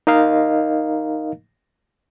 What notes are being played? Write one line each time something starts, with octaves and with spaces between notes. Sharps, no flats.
D#4 A#4 D#5 F5